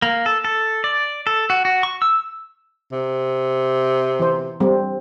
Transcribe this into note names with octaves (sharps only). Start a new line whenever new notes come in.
A#3
A4
A4
D5
A4
F#4
F#4
C#6
E6
C3
E3 C5
G3 C4